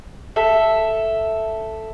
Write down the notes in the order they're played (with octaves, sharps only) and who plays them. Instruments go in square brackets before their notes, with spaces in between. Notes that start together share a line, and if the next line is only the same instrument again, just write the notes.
[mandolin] A4 E5